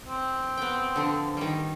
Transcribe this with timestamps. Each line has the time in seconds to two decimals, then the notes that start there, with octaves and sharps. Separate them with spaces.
0.06 C4
0.57 B3 G5
0.96 D3 F3
1.37 D#3 G3